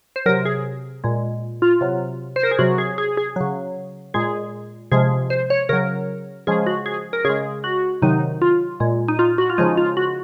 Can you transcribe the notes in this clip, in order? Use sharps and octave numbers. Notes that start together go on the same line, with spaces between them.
C5
C3 F#3 A#4
G#4
A#2 G#3
F4
C3 F#3
C5
A#4
G#4
C3 F#3 F#4
G#4
G#4
G#4
C#3 F#3
A#2 G#3 G#4
C3 F3 G#3 G#4
C5
C#5
C#3 F#3 A#4
C#3 F3 G#3 G#4
F#4
G#4
A#4
C#3 G#3 G#4
F#4
C3 D#3 F#3 D#4
F4
A#2 G#3
D#4
F4
F#4
F4
C#3 F3 G#3 D#4
F4
F#4